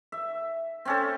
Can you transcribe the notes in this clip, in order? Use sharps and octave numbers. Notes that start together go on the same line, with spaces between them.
E5
C4 C#4 A4